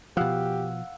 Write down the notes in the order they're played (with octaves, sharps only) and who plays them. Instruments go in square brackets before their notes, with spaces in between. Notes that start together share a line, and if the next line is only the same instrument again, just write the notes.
[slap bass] B2 F3 [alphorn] G4 [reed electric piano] F5 F#5 E6